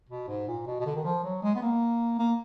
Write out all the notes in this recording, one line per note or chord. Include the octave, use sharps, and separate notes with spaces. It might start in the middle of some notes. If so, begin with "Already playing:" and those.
B2
G#2
A#2
B2
B2
D3
D#3
F3
F#3
G#3
B3
A#3
A#3